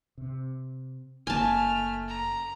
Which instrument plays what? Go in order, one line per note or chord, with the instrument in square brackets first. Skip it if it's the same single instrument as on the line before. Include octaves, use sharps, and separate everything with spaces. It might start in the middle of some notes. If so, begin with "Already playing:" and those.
[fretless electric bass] C3
[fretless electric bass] F#1 A#3 [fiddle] A3 F6 [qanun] G#5 A5
[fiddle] A#5